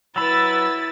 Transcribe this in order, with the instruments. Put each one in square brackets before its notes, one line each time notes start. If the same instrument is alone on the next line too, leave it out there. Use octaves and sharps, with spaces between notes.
[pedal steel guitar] F#3 B5 [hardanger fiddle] E4 B4 [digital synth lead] E6 [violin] A6